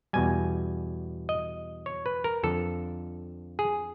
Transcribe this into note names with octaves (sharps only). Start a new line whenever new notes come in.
E2 B2 G3 G#5
D#5
C#5
B4
A#4
F2 D3 F3 A4
G#4